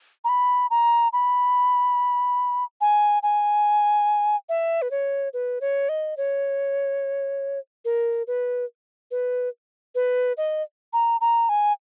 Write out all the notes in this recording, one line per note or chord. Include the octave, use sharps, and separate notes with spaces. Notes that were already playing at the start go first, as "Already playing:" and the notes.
A#5
B5
A#5
B5
G#5
G#5
E5
B4
C#5
B4
C#5
D#5
C#5
A#4
B4
B4
B4
D#5
A#5
A#5
G#5